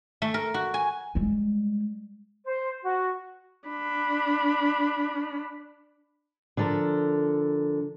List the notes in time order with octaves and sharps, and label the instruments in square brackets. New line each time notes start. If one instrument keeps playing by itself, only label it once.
[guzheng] A3
A#4
F#4
G#5
[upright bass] G3 G#3
[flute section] C5
F#4
[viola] D4 B5
[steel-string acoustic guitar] D3 F3 A4 A#4